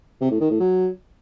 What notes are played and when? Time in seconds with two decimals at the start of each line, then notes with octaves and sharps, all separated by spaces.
0.21 C3
0.31 A2
0.40 D#3
0.50 A2
0.60 F#3